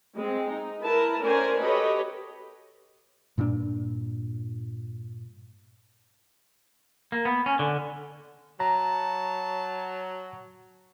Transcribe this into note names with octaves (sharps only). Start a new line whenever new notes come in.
G#3 C4
D#4
E4 A#4 B4 A5
A3 C#4 A#4 C5 D5 G#5
F#4 G4 A4 B4 C#5 D#5
G2 A#2 B3 D4
A#3
B3
C#4
D3
F#3 A5 A#5